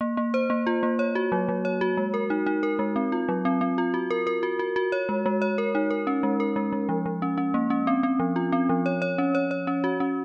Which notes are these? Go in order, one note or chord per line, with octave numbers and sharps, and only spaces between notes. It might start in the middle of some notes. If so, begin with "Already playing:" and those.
A#3
A#3
C5
A#3
F4
A#3
C#5
F#4
F#3
F#3
C#5
F#4
G#3
A#4
D#4
D#4
A#4
G#3
C4
F4
F#3
C4
C4
F4
F#4
A#4
A#4
F#4
F#4
F#4
C#5
G#3
G#3
C#5
A#4
D#4
A#4
C#4
G#3
A#4
G#3
G#3
F3
F3
C#4
C#4
A#3
C#4
C4
C4
F3
F4
C4
F3
C#5
C#5
C#4
C#5
C#5
C#4
F#4
C#4